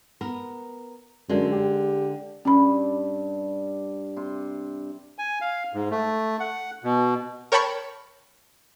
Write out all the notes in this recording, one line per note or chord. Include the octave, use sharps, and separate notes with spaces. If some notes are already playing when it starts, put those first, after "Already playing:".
B3 A#4
F#2 D3 G#3
G4
G2 G3 C#4 B5
C3 C6
G#5
F5
G#2
A3
F#5
B2
A#4 C#5 G5 A5 B5 C#6